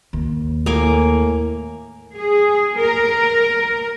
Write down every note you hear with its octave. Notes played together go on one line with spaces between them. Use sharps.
D#2
A2 A#3 G#5 D6
G#4
A#4